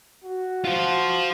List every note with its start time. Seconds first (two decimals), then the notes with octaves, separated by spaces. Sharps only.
0.24 F#4
0.65 F4 C5